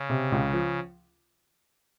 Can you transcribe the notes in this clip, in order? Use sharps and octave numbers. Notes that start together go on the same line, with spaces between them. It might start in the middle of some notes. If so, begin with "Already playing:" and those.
Already playing: C#3
C3
C#2
F3